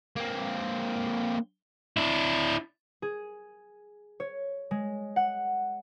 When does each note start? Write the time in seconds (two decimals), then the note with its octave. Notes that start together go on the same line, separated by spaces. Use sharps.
0.16 A#3 C4
1.97 D4 E4
3.02 G#4
4.20 C#5
4.71 G#3
5.16 F#5